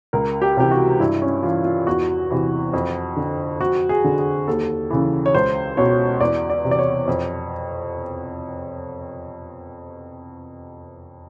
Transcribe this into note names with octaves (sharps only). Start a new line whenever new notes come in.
C#2 A#4
G4
C3 E3 G4
F#4
G2 E4
C#4
E3 F4
F4
E2 F#4
C3 E3
F2
D3
F2 F#4
G#4
D3
G#4
D#2 A4
C#3 E3
C#5
C#2 C5
B2 C#5
E2 D5
D5
C3 E3
D5
C#5
F2